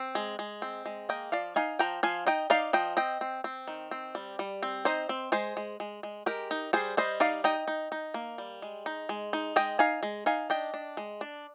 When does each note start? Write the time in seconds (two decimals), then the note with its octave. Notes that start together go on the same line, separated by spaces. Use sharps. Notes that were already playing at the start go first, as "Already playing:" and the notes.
Already playing: C4
0.15 G#3
0.39 G#3
0.62 C4
0.86 G#3
1.09 A#3 D#5 G5
1.32 F3 D5 F5
1.56 D#4 F5 G#5
1.79 F3 G5 A#5
2.03 F3 F5 G#5
2.27 D#4 D#5 G5
2.50 D#4 D5 F5
2.73 F3 D#5 G5
2.97 C4 D#5 G5
3.21 C4
3.44 C4
3.68 D#3
3.91 C4
4.15 G3
4.39 G3
4.63 C4
4.85 D#4 C5 D#5
5.09 C4
5.32 G#3 G#4 C5
5.57 G#3
5.80 G#3
6.03 G#3
6.26 G#3 G4 A#4
6.51 D#4
6.73 G3 G#4 C5
6.97 G3 C5 D#5
7.20 D#4 D5 F5
7.44 D#4 D#5 G5
7.68 D#4
7.92 D#4
8.14 A#3
8.38 G3
8.62 G#3
8.86 D#4
9.09 G#3
9.33 D#4
9.56 G#3 D#5 G5
9.79 D#4 F5 G#5
10.03 G#3
10.26 D#4 F5 G#5
10.50 D4 D#5 G5
10.74 D4
10.97 G#3
11.21 D4